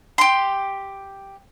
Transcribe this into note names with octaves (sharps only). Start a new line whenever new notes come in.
G4 C6